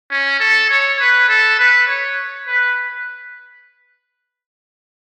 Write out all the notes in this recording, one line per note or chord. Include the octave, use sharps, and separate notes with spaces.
C#4
A4
C#5
B4
A4
B4
C#5
B4